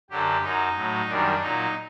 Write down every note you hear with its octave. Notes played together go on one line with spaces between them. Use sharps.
F#2 D3 F#3 G4
F#2 F#3 D#4
A2 F#3
F#2 D#3 G3 D4
A#2 F#3 D#4